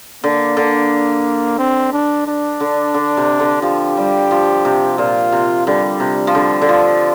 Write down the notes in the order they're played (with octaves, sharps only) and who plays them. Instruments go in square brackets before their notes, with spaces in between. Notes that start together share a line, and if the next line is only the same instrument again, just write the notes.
[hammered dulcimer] D3 [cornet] A#3
[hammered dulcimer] D3
[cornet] C4
D4
D4
[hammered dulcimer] D3
D3
C3
D3
[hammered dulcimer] F3 [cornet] G4
[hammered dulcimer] G3
F3
C3
[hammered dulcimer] A#2 [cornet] F4
[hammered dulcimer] C3
[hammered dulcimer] D3 [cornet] G3
[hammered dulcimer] C3
F3
D3
D3
F3